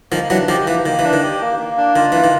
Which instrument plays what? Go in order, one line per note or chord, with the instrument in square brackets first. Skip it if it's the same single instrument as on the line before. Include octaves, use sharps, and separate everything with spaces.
[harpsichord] D#3 F3 [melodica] A#3
[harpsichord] E3 F#3 [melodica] D4
[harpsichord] D#3 F3 [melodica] G4
[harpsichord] E3 [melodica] A#3
[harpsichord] D#3 [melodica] A#3
[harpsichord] E3 [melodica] D4
[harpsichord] D#3
[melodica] G4
A#3
A#3
D4
[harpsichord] D#3 [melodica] F4
[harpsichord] E3 [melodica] A#3
[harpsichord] D#3